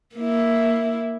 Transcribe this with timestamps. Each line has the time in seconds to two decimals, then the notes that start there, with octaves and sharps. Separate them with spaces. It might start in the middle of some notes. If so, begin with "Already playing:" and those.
0.16 A#3 E4